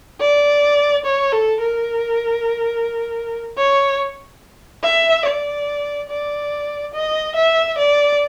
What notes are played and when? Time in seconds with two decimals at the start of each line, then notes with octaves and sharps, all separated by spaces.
0.21 D5
1.05 C#5
1.33 A4
1.62 A#4
3.58 C#5
4.83 E5
5.25 D5
6.09 D5
6.94 D#5
7.35 E5
7.78 D5